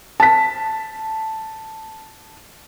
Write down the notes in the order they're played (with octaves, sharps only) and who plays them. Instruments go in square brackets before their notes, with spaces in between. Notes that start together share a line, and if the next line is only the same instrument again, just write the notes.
[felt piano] A5 B6